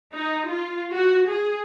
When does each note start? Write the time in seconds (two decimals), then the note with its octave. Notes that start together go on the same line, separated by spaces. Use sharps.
0.14 D#4
0.48 F4
0.94 F#4
1.28 G#4